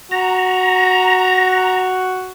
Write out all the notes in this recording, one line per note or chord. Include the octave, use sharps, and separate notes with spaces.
F#4 A#5